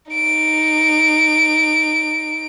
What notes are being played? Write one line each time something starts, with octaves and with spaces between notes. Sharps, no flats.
D#4 D7